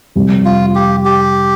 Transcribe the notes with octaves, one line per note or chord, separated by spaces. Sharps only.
F2 C3 G3
F4
G4
G4